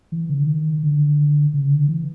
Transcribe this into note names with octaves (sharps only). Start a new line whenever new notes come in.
E3
C#3
D3
D#3
D3
C#3
D3
E3